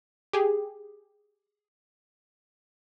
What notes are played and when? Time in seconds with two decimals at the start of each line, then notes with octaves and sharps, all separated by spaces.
0.33 G4 G#4